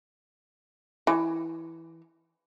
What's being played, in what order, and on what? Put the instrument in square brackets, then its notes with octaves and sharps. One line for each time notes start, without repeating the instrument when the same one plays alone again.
[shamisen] E3